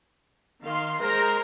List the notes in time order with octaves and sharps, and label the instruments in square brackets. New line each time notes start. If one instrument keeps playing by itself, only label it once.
[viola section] D#3 F5 C6
[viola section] G#3 C5 A#5 [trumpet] A#4